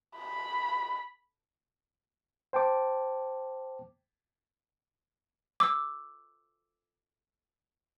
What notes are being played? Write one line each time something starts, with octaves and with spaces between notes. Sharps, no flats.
B5
C5 G5 A5 D6
D6 E6